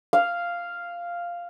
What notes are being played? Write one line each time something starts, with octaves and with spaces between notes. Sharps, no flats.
F5